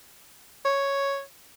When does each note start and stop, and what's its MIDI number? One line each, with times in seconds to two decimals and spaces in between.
0.65 1.22 73